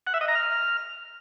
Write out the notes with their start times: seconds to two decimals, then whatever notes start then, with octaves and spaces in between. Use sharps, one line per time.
0.07 F#5
0.14 E5
0.21 D#5
0.28 A#5
0.35 F6